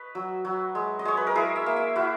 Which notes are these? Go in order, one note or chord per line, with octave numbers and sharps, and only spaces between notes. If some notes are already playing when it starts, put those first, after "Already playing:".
Already playing: B4 C#5 D#5
F#3
F#3
G#3
D#5
G#3 C#5
B4
A#4
E4 G#4
E5
A#3
E5
E4 F#4